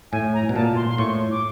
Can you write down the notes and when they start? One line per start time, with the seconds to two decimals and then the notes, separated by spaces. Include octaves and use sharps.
0.12 A2 G#5
0.34 A#5
0.49 B2
0.55 A#2 A5
0.76 C6
0.88 C6
0.98 A2 C#6
1.31 D6